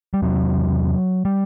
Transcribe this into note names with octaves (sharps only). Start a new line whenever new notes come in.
G3
E2 C3 F#3
G3